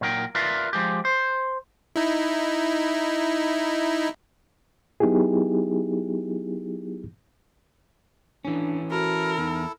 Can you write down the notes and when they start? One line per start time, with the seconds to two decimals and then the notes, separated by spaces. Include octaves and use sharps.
0.01 A#2 F#3 A#4 G5
0.35 F4 A#4 B4 D5 E5 F5
0.73 F3 G#3 G4
1.05 C5
1.96 D#4 E4
5.00 F#3 B3 D#4 E4 G4 G#4
8.45 E3 C#4 D4
8.91 E4 F#4 A4 A#4
9.38 E2 D#4